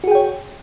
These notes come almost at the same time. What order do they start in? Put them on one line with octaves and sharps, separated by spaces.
F#4 G#4 G5 C#5